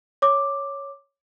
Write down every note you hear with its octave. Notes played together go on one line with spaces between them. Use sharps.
C#5 D6